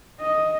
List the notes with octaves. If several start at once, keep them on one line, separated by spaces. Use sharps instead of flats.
D#5